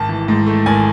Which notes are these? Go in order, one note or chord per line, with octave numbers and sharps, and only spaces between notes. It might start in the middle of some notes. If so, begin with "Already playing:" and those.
Already playing: G#1 A5
E3
G#2
A3
G#1 G#5